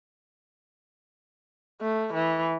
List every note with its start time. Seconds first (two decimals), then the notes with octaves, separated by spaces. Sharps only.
1.81 A3
2.14 E3